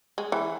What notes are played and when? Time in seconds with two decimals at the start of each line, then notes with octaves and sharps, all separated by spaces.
0.18 G#3
0.32 E3